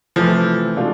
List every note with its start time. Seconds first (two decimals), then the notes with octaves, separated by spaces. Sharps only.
0.16 C3 E3 F3 A3 C4
0.77 B2 G#3 D4 F4 A4